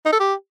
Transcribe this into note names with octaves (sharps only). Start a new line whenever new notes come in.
D#4
A4
G4